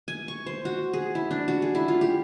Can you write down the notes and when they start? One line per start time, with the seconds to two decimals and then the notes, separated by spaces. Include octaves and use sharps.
0.08 G#5
0.28 C#6
0.46 C5
0.65 F#4
0.93 G#4
1.15 E4
1.31 D4
1.48 F#4
1.62 G#4
1.75 E4
1.88 F4
2.01 G4